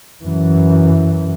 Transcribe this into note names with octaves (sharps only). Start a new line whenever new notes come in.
F#2 E3